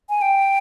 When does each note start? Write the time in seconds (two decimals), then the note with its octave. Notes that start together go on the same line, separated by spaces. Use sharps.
0.09 G#5
0.22 G5